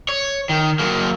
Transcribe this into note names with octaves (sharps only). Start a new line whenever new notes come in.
C#5
D#3
F#3 A#3